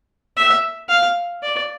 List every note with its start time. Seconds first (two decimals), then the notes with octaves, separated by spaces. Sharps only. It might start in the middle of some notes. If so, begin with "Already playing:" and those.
0.37 E5
0.89 F5
1.43 D5